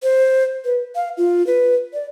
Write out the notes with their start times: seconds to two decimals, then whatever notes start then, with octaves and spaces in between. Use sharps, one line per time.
0.03 C5
0.65 B4
0.95 F5
1.17 F4
1.47 B4
1.93 D5